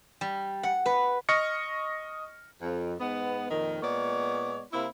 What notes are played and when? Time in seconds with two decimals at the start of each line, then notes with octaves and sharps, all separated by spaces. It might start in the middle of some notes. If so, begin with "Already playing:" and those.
0.21 G3
0.63 F#5
0.86 B4
1.29 D#5 C#6 F6 A#6 C#7
2.61 F2
2.99 G#2 G#3 B3
3.50 F2 A#2 D#3
3.81 A#2 G#3 B3 C#5 D5
4.73 C3 A#3 C4 E4